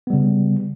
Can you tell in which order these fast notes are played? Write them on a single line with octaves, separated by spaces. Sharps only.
B3 G3 C#3